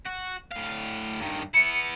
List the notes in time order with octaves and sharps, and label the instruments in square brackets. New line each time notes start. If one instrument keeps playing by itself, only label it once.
[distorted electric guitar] F#4
A2 F5
G2 D#3
[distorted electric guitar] B3 E4 [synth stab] C#7